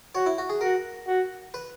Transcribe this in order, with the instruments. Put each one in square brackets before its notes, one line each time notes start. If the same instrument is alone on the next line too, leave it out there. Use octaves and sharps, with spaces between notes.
[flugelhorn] F#4 [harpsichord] C#5
[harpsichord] E4
F#4
G#4
[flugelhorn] F#4 [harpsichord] A#4
[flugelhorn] F#4
[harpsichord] B4